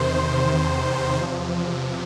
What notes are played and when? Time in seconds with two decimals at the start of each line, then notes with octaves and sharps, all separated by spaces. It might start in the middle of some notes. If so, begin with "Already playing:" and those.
Already playing: E2 C3 D#3 C5
1.18 E2 C3 F3